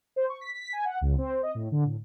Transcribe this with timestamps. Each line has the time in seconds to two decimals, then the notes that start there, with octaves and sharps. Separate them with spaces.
0.16 C5
0.29 C#6
0.41 B6
0.54 B6
0.73 G#5
0.85 F#5
1.01 C#2
1.18 C4
1.43 D#5
1.55 A2
1.72 D3
1.85 A2